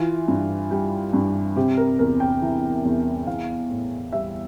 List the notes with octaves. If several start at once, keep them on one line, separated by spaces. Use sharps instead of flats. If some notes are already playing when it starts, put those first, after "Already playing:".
Already playing: E3 F4
G2
G3
G2
C3 G4
A#4
E2 A#4
G5
E3
E2
E3 F5
A2
G3 E5